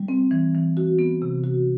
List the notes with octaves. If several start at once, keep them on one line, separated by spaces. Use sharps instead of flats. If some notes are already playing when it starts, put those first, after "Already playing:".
Already playing: G3
C4
E3
E3
F#4
B3
C3
F#4